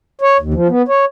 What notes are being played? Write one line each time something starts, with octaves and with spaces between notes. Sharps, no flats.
C#5
D#2
F3
B3
C#5